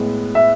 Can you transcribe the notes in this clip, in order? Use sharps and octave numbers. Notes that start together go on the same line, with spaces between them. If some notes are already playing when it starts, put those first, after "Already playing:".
Already playing: A2 G#3 B3
E5